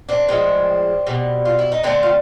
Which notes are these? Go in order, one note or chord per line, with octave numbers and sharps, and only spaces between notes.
C4 D4
A2 F3 G#3 C4 D4
B2 G3
F4
E4
D#4
D3 F3 A3 C4 D4
F4